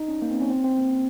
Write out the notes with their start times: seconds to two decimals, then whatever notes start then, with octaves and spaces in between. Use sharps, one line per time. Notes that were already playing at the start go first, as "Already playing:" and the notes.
Already playing: D#4
0.08 C#4
0.22 A#3
0.31 C4
0.41 C#4
0.50 C4
0.64 C4
0.78 A#3